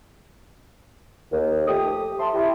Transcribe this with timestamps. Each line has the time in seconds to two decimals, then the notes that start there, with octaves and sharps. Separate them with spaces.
1.33 D#2
1.68 F3 A3 G4 D#6
2.20 E5 A5 C6
2.34 E4 G4